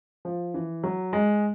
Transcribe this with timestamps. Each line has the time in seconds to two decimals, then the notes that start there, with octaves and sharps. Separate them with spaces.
0.25 F3
0.54 E3
0.84 F#3
1.13 G#3